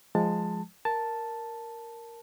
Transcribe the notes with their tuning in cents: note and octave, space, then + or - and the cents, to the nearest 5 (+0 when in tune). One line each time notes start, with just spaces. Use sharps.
F3 +0 G#3 +0 A5 +15
A#4 +0 A5 +0